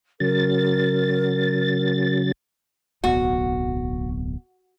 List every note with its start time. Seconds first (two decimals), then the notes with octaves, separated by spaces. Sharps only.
0.20 C#3 F#3 A#4 A6
3.04 D1 B1 B3 F#4